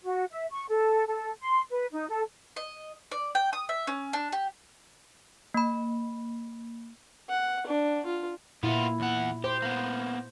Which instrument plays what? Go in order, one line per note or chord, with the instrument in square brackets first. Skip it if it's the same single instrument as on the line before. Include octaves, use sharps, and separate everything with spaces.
[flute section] F#4
E5
C#6
A4
A4
C6
B4
D#4
A4
[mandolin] D#5
D5
G5
D#6
E5
C#4
D4
G4
[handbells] A#3 B5
[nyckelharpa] F#5
D4
F4
[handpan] A#2 E4 [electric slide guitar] B3 F4
[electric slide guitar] E2 F#5
[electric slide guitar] G4 [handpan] C5
[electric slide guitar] A#3 B3